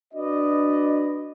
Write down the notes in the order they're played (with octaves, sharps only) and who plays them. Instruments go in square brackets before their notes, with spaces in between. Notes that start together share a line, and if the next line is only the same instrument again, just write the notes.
[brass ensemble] D4 F#4 B4 D5 D#5